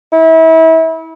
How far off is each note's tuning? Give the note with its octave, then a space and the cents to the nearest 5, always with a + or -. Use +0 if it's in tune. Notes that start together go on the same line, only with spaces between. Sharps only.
E4 -30